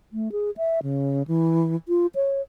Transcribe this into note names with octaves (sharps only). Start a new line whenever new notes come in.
A3
G#4
E5
C#3
E3
F4
C#5